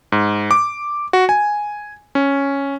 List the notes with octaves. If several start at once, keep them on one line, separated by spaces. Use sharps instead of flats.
G#2
D6
F#4
G#5
C#4